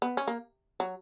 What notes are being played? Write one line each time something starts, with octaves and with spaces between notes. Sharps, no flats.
B3
C#4
A#3
F#3